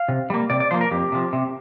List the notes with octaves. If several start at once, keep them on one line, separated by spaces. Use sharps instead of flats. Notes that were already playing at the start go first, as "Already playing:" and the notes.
Already playing: F5
C3
G3 A#3
C3 D5
D5
F3 A#3 C5
A#4
F2 G4
C3 F3
C3